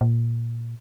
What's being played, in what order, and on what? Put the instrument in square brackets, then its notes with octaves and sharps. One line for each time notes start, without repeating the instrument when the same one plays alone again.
[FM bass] A#2